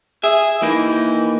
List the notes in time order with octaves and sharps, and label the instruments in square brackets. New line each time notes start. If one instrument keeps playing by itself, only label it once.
[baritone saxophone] G#4 [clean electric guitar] E5
[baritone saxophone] E3 [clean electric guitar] A#3 D#4